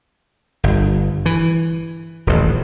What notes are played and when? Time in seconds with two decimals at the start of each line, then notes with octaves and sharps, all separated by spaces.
0.63 G1 G2
1.26 E3
2.27 D#1 A1